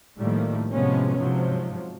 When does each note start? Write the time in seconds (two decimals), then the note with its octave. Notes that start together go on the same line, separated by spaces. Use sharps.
0.20 A2 D#3 F3 G3 A3 A#3
0.72 A2 C3 F3 G#3 B3 C#4
1.19 G#2 C3 F3 F#3